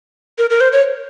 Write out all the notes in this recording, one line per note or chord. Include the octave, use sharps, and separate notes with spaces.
A#4
A#4
C5
C#5